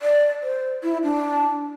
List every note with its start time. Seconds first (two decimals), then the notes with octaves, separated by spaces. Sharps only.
0.02 D5
0.43 C5
0.83 E4
1.03 D4